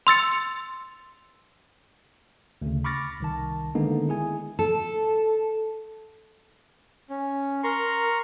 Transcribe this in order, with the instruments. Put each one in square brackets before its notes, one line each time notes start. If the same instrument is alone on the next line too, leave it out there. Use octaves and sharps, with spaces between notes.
[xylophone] C6 E6 A6 C#7
[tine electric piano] D2 C#3
B5 C#6 D6 F6 A6 A#6
C2 D#3 A5
D3 D#3 G#3 A#3 B3 D#4
E4 G#4 G#5
[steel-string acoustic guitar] A4
[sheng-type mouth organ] C#4
[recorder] A#4 [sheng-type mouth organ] A#5 C6 C#6